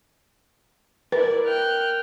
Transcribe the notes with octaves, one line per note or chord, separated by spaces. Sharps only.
E4 A#4 B4 D5
G5 F6 F#6